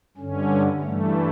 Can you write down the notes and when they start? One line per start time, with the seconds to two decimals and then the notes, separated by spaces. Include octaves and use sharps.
0.17 G2 D3 C#4
0.81 G2 E3 A3